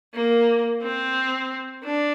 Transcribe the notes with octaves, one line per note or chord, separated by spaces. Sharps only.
A#3
C4
D4